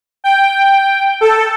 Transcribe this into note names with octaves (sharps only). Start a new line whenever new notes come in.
G5
A4